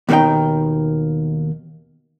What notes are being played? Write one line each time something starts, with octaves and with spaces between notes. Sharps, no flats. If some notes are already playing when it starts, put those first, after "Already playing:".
D#2 B2 D#3 F#3 D#4 G5